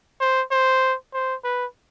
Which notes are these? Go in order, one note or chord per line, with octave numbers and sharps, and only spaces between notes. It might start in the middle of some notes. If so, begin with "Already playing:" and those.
C5
C5
C5
B4